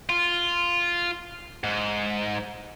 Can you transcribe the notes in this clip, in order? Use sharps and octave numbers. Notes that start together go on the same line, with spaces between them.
F4
G#2